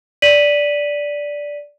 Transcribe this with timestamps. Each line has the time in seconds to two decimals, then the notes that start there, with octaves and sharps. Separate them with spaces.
0.22 D5 B6 D#7 F#7